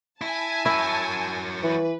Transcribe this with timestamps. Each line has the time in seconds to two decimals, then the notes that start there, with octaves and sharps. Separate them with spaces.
0.21 E4 G#5 A5
0.66 F#3 E4 A#4
1.63 E3 B4